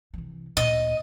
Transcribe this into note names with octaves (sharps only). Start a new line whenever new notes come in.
C3 E3
D2 A#2 D#5